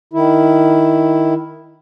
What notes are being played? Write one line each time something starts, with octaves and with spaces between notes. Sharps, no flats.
D#3 E4